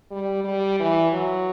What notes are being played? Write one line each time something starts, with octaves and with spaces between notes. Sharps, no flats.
G3
G3
E3
F#3